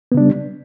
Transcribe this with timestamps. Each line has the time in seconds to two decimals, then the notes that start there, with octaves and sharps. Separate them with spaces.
0.12 B3
0.15 C#3
0.17 D4
0.20 G3